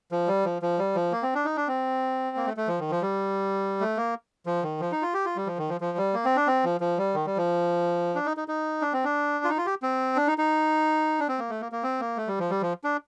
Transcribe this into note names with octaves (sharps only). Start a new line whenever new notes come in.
F3
G3
F3
F3
G3
F3
A#3
C4
D4
D#4
D4
C4
A#3
A3
A3
F3
D#3
F3
G3
A3
A#3
F3
D#3
F3
D#4
F4
G4
F4
G3
F3
D#3
F3
F3
G3
A#3
C4
D4
C4
F3
F3
G3
D#3
G3
F3
D4
D#4
D#4
D#4
D4
C4
D4
F4
D#4
F4
G4
C4
D4
D#4
D#4
D4
C4
A#3
A3
A#3
A#3
C4
A#3
A3
G3
F3
G3
F3
D4